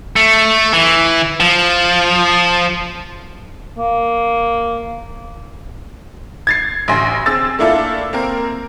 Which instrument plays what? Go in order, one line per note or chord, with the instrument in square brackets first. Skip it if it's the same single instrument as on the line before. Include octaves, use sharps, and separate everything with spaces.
[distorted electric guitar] A3
E3
F3
[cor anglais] A#3
[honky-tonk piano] G#6 A6 C7
A1 D2 G#5 C6 A#6
C4 G#4 E6 A6
A3 A#3 D4 E4 F4 A4
A#3 C4 A#4